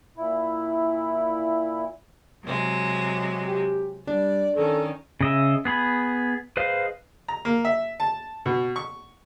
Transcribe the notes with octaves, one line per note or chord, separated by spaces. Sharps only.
A#2 E4
C3 F#3 G#3
G4
G3 D4 D5
D#3 C#4 A4
C#3 D#5 E5
B3 G#4 B5
G#4 B4 C5 D#5 F5
A#5
A#3
E5
A5
B2
C#6